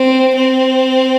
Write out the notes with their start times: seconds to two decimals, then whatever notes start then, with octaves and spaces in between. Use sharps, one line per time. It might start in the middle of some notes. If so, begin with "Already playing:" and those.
Already playing: C4
0.35 C4